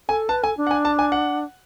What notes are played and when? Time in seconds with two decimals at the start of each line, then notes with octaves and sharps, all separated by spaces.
0.09 A4 G#5
0.29 B4 A5
0.43 A4 G#5
0.57 D4
0.67 F#5
0.71 G#5
0.85 A5
0.99 G#5
1.12 F#5